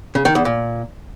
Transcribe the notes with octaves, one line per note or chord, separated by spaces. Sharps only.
C#3
D#3
E2
A#2